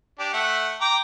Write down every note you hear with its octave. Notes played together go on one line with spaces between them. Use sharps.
D4 G4
A3 E5 F#5
G5 A#5 D6